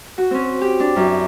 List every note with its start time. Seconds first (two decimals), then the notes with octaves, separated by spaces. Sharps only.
0.18 F#4
0.31 C4 C#4
0.61 G4
0.80 D4
0.96 F#2 E4